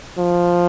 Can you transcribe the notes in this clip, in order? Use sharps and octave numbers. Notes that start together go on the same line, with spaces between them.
F3